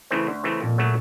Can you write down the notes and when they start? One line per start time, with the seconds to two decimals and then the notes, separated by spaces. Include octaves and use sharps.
0.11 C#3 E3 A3 C4
0.27 D2
0.44 C#3 E3 A3 C4
0.61 F2 A#2
0.78 C#3 F#3 A3